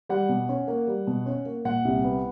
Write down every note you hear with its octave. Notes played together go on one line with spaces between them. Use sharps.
G3 F#5
B2
C#4
A#3
G3
B2
C#4
A#3
A#2 F#5
C2
B3